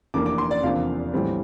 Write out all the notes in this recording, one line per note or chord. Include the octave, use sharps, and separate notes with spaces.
F1 F2 E3 A#3 D4 D6
D6
C6
D5
E2 C3 F3 A#3 D4 F5
A#1 A2 E3 G3 C4